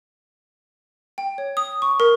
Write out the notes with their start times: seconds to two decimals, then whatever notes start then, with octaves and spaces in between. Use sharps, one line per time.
1.18 G5
1.38 C#5
1.57 D#6
1.82 C#6
2.00 A#4